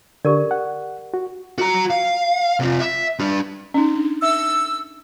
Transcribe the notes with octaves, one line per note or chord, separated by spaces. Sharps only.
D3 G4 A#4 D5
F#5
F#4
F#4 A#5
F5
C3 F4
E5
D4 G4
C#4 D#4
D4
E5 E6